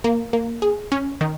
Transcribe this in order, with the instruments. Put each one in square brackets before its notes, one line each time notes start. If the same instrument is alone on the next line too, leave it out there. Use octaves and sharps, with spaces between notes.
[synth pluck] A#3
A#3
G#4
C#4
D#3